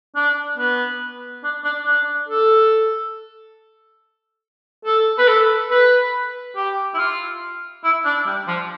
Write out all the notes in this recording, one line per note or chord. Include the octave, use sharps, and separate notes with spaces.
D4
B3
D4
D4
D4
A4
A4
B4
A4
B4
G4
E4
F4
E4
D4
G3
F3